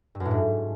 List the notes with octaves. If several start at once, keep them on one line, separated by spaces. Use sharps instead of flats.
G2
F#2
A2
G#2